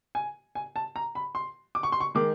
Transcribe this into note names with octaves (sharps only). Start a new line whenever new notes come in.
G#5
G#5
A5
A#5
B5
C6
D6
C#6
C6
C#6
D#3 G#3 D6